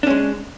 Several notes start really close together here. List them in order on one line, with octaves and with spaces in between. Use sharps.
D4 C#4 G#3